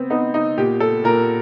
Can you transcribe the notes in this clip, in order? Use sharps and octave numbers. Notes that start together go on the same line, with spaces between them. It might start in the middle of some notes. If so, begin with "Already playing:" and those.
Already playing: B3 C4
B3 D#4
D#4
A#2 G4
A4
A#2 A#4